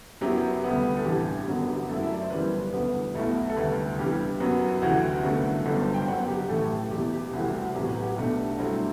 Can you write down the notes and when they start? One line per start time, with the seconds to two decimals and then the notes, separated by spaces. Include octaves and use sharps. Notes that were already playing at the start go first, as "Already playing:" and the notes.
0.21 F#2 F#3 B3 E4 G4
0.64 D2 C3 G3 B3
0.97 A4
1.05 A1 G2 E3 G4
1.47 G1 F#2 D3 F#3 B3 F#4
1.68 G4
1.89 F#2 F#3 A3 E4 A4
2.03 E5
2.13 D5
2.22 C5
2.30 G1 F#2 E3 G3 B4
2.73 E1 D2 D3 G3 B3 B4
3.14 B1 B2 A3 E4
3.50 A4
3.56 D2 C3 G3 B4
3.98 G1 G2 E3 G3 G4
4.40 F#2 F#3 B3 F#4
4.82 D2 C3 E3 F#4
5.23 G1 F#2 D3 A3
5.66 G1 G2 F#3 A4
5.80 C5
5.94 G5
6.07 G1 F#2 F#3 F#5
6.28 G4
6.39 G4
6.49 A1 A2 E3 A3 E4 A4
6.91 F#1 E2 B2 G4
7.13 G4
7.33 C2 C3 E3 A3 C4 F#4
7.54 F#4
7.74 A1 A2 F#3 B3 G4
7.89 B4
7.98 F#4
8.03 G4
8.17 B1 B2 A3 D4
8.58 G2 F#3 A3 C4 E4